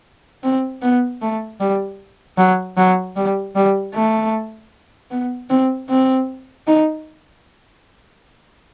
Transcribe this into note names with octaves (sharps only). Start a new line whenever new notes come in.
C4
B3
A3
G3
F#3
F#3
G3
G3
A3
B3
C4
C4
D#4